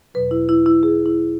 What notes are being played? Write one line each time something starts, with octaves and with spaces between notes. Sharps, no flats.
E2 B2 F#3 B4
E4
E4
E4
G#4
E4